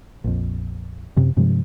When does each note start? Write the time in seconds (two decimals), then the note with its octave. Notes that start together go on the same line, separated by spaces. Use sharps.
0.24 A#1 F2
1.16 F#2 C3
1.37 G2 C3 F3 G#3